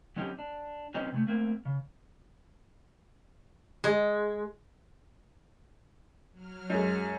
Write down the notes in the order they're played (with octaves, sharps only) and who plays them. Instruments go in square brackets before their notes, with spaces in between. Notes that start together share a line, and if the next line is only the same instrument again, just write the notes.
[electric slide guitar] F#3 C4 C#4 D#4 F4 G4
D4
F#3 C4 C#4 D#4 B4 D#5
C3 G#3 A3
A3 A#3 C4
C#3
[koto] G#3
[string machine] F#3 F6
[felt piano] F#2 G#3